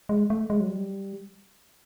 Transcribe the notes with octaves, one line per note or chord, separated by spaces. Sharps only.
G#3
A3
G#3
F#3
G3